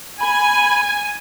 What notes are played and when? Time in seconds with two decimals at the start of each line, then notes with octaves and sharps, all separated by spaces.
0.21 G#5 B5